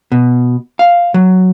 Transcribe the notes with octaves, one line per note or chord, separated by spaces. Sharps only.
B2
F5
F#3